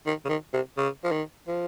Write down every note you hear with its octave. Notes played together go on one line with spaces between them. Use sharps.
D#3
C#3
D#3
C3
C#3
F3
D#3
F3